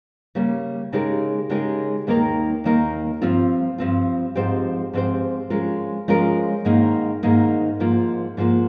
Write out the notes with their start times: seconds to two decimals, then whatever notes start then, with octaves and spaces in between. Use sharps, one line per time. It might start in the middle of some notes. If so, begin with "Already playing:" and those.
0.35 C#3 G3 A#3
0.92 C#3 G#3 D#4 G4 A#4
1.49 C#3 G#3 D#4 G4 A#4
2.07 D#2 D#3 A#3 D#4 A#4
2.64 D#2 D#3 A#3 D#4 A#4
3.22 G2 F3 C4 F4
3.78 G2 F3 C4 F4
4.35 G#2 F3 C4 G4 C5
4.93 G#2 F3 C4 G4 C5
5.50 F3 G#3 C#4 F4 A#4
6.08 F3 G#3 C#4 F4 A#4
6.65 G#2 D#3 A#3 D#4
7.23 G#2 D#3 A#3 D#4
7.80 G#2 F3 A#3 F4
8.37 G#2 F3 A#3 F4